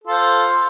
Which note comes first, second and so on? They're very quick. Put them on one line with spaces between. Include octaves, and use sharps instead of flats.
A4 F4 C5